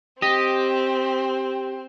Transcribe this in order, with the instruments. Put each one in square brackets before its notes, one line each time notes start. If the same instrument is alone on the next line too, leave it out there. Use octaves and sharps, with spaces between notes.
[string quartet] C4 [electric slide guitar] G4 [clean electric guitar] D#5